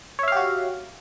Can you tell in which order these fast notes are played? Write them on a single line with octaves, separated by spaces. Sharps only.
C#5 E5 F5 G4 F#4